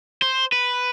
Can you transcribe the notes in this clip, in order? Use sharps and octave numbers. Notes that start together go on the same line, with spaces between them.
C5
B4